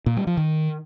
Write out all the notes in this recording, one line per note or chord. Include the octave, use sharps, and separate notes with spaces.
A#2
G3
F3
D#3